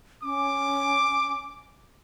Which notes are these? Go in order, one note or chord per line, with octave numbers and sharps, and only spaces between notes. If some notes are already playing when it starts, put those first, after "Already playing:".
C#4 D6